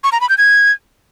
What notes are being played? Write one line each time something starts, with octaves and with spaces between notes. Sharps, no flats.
C#6
A#5
B5
G6
G#6